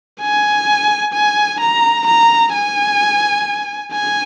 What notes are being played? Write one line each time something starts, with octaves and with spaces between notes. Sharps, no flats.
G#5
G#5
A#5
A#5
G#5
G#5